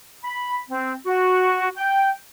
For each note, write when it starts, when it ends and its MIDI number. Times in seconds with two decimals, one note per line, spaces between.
0.24 0.56 83
0.69 0.93 60
1.06 1.69 66
1.77 2.10 79